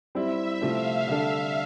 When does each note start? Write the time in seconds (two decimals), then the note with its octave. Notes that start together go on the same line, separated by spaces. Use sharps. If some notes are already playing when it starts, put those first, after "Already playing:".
0.15 G3 C4 E4 E5
0.61 C3 F3 A3 C4 F5
1.07 D3 G3 D4 A4